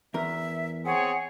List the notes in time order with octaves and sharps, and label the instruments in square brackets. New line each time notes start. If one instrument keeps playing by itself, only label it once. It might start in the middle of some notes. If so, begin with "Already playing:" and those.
[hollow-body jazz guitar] E2 A#4 [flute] E5
[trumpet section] C4 G#4 C#5 [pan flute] F#5 [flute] G#5